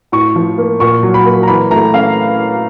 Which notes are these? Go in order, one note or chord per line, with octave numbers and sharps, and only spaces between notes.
A2 C#6
F3
A#3
A#2 C#6
F#3
B5
A#3
A#5
E3 B5
A3 A#5
C#4 F5